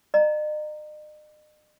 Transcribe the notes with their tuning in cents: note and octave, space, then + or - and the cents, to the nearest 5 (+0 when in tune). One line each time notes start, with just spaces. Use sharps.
D#5 -45 A#5 -10